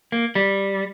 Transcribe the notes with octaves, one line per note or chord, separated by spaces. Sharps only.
A#3
G3